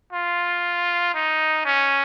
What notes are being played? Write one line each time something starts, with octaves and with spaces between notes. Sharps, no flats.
F4
D#4
C#4